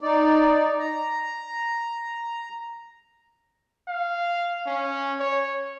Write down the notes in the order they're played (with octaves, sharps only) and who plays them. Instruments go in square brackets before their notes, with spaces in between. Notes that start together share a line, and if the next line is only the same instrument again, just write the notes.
[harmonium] D#4 D5
A#5
[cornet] F5
C#4
C#5